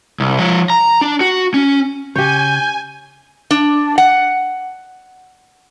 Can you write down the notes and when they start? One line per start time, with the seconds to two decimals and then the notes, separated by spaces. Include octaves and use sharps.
0.20 C2
0.39 F3 C#5
0.70 A#5
1.01 D4
1.21 F#4
1.54 C#4
2.16 C#3 G4 C#5 G#5 G6
3.51 D4
3.98 F#5